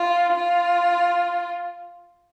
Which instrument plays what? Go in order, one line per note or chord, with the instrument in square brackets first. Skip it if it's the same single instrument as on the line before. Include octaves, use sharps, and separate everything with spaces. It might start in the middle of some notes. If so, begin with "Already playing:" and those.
Already playing: [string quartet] F4
F4